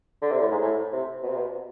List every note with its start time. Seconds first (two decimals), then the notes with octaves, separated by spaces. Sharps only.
0.22 D3
0.31 C3
0.41 A2
0.51 G#2
0.61 A2
0.93 C3
1.23 B2
1.29 C3
1.37 B2